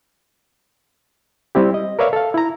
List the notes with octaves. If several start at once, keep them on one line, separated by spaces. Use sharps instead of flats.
G3 C4 E4 G4
D#5
A#4 B4 C#5 D5 E5 F5
A4 F5
E4 A#5